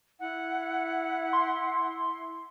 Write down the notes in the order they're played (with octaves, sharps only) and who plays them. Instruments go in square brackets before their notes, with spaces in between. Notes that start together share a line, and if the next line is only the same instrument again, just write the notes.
[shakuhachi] E4 [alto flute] F#5
[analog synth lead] C6